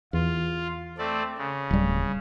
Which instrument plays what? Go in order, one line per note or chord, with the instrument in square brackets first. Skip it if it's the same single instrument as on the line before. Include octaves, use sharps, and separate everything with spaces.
[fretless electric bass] E2 [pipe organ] F4
[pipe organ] A3 C4 D5
C#3
[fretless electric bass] D1 G3